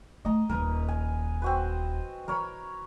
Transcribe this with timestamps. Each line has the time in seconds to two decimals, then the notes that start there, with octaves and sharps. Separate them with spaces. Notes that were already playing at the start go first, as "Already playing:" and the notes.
0.25 A3 D#5 A#5
0.49 D#1 D#4 A#4 B4
0.88 G#5
1.42 C4 F#4 B4
2.28 E3 A#4 C#5 B5